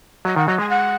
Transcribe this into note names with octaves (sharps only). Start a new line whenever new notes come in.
F#3 D#5
D#3 F#5
F#3 D#5
G#3 G#5
F#5